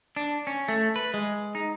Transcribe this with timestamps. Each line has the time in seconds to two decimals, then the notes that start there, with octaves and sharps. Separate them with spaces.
0.16 D4
0.47 C#4
0.68 A3
0.96 B4
1.14 G#3
1.55 D#4